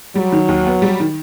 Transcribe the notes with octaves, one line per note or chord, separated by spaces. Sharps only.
F#3 G3
D#3
D#2
B3
G3
D#3